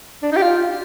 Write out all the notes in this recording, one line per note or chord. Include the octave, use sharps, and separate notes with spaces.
D4
D#4
G4
F4